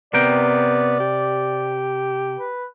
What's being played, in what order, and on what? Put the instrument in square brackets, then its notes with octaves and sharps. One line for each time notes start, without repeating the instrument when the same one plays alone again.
[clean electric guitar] C3 A#4 G5 [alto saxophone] B3 [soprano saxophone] D5
[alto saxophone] G4
[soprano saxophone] B4